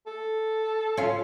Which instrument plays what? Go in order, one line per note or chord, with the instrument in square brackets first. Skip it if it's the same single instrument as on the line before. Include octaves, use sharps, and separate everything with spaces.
[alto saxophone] A4
[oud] C#4 F4